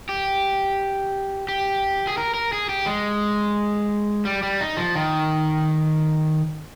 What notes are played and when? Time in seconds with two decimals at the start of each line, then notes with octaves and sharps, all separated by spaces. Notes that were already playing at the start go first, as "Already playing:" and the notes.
0.09 G4
1.49 G4
2.07 G#4
2.18 A#4
2.34 A#4
2.53 G#4
2.69 G4
2.86 G#3
4.25 G3
4.43 G3
4.61 D#4
4.77 F3
4.95 D#3